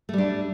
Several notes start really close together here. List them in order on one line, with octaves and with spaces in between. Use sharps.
A3 G3 D4